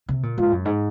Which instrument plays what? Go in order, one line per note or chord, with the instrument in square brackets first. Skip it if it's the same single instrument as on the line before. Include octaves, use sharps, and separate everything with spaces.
[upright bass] C3
A#2
[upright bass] G#2 [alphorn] F4
[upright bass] F#2
G#2